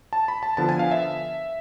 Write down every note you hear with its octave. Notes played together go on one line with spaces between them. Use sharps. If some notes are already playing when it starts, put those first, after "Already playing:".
A5
B5
A5
D3 F3 B3 A5
G#5
F5
E5